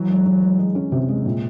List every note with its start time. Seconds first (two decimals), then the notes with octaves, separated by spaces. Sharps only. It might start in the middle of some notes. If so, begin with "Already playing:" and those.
Already playing: E3 F#3
0.10 G#3
0.26 E3
0.43 G#3
0.59 G#3
0.75 C#4
0.92 C3
1.09 G#3
1.26 A#2